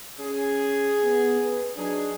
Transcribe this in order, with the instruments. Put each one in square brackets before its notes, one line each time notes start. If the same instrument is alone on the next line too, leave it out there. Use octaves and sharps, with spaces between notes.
[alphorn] C#4 [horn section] G#4
[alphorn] B3
B4
[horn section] F#3 D#4 G#4 [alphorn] D4